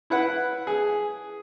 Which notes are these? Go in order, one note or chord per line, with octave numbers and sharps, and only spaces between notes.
E4 B4 F#5
G#4